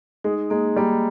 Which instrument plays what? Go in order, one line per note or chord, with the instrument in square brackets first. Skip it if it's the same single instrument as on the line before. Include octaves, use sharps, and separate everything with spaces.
[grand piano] G#3 [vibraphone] D#4
[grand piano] G#3 [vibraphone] A#3
[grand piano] G3 [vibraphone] A#3